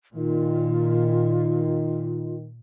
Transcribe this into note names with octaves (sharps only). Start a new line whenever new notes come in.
A#2 D#3 F4